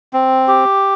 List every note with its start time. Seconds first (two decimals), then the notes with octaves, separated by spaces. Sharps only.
0.13 C4
0.48 G4